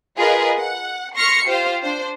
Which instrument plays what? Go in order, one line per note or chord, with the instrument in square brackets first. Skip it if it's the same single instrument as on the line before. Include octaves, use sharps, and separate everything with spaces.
[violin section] F4 G#4 A#4 B4 D#5
F#5
C6 C#6 F6 A#6 C7 C#7
F4 G4 C5 F5
D4 C5